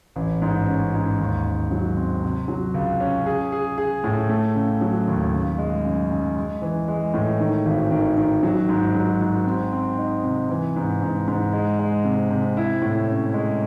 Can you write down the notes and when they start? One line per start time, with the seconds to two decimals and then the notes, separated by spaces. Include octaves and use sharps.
0.16 A1
0.42 G#2
0.67 C#4
0.94 G#2
1.19 D#2
1.45 D#2
1.71 F#3
1.97 C4
2.23 C3
2.48 F#3
2.74 C#2
3.00 C#4
3.26 G#4
3.52 G#4
3.78 G#4
4.04 A2
4.29 A3
4.55 C#3
4.81 F#3
5.07 D#2
5.32 C#3
5.58 G#3
5.85 F#2
6.11 F#2
6.36 G#3
6.62 E3
6.88 G#3
7.14 A2
7.40 D#3
7.66 G#1
7.91 D#3
8.17 D#3
8.43 F#3
8.69 G#2
8.95 F#3
9.21 G#2
9.46 C4
9.73 C4
9.98 D#4
10.24 C3
10.50 E3
10.76 G#2
11.02 G#2
11.28 G#2
11.53 G#3
11.79 G#3
12.04 C3
12.30 C3
12.57 E4
12.82 A2
13.08 C#4
13.34 G#3